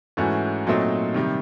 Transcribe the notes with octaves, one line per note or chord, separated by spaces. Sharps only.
G#2 E3 A3 C#4 F#4
A#2 F#3 A3 C4 D#4
C3 D#3 G3